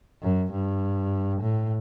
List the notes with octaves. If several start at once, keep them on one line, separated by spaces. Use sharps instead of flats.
F#2
G2
A2